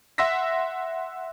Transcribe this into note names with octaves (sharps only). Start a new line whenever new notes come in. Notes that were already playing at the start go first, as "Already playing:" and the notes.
E5 F#5 C6 E6 A#6 B6